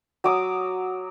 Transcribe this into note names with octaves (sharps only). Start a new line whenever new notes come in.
F#3 D6 D#6